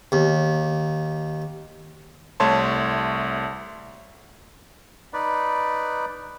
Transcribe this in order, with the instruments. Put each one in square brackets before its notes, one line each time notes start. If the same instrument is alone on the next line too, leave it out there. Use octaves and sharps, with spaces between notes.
[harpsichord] D#2
[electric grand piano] C2 A3 C#5 A5 C6
[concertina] D#4 B4 D5